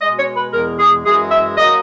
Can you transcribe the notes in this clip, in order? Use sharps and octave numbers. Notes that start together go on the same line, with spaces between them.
B2 G#3 D#5
C#5
B4
E2 B2 G#3 A#4
G#4
F#2 E3 G#3 G#4
E5
F#3 A#3 D#5